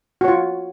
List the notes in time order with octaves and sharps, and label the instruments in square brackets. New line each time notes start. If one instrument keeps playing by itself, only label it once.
[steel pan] F#4
C#5
F4